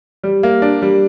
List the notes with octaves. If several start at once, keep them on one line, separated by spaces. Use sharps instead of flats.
G3
A#3
D4
G3